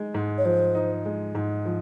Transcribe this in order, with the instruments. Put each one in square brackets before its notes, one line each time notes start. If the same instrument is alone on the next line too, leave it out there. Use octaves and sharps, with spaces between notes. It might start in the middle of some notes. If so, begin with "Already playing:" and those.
Already playing: [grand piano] G#3 D#4
G#2
[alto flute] C#5
[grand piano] F3 [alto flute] C5
[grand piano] D#4
G#3
G#2
F3